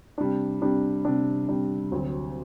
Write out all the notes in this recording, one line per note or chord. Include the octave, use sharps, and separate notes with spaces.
C3 G3 D4
C3 G3 D4
C3 G3 D4
C3 G3 D4
D2 C3 F#3 C4